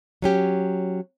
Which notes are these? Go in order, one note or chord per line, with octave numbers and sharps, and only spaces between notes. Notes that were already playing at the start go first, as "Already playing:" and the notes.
F#3 C#4 G4